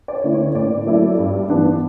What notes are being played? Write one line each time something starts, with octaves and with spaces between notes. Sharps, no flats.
D5
C#5
D3 A3 C#4 E4
C#5
A2 D5
F#3 A3 E4
G2
E3 B3 D4